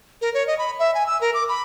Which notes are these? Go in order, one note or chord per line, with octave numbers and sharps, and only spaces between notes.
A#4
C#5
D#5
B5
E5
G#5
E6
A#4
D6
B5